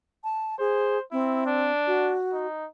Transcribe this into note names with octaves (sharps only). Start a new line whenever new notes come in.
A5
G#4 C5
C4 E4
D4
F#4
D#4